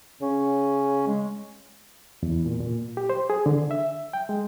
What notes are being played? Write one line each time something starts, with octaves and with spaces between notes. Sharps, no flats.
C#3 C#4
G#3
E2
A#2
A#2
G4
C5
G#4
D3
E5
G5
G#3